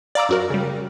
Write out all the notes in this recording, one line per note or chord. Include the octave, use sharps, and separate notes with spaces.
D5 F5 A#5 D6 E6
F#2 F#4 A#4
C#3 G3